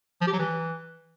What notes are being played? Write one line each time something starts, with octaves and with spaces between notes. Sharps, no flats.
F3
G4
F#3
E3